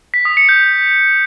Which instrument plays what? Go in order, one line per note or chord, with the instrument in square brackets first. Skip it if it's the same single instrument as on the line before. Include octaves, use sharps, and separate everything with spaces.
[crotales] B6
D#6
C#7
G6